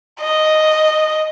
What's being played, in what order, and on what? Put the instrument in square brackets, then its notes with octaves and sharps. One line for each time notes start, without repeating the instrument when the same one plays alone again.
[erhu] D#5